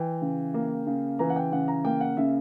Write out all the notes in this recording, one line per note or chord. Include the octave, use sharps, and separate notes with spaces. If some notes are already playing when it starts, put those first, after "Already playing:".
Already playing: E3 G5
C#3
A#3
C#3
E3 A#5
F#5
G5
C#3 F#5
A#5
A#3 G5
F#5
C#3 E5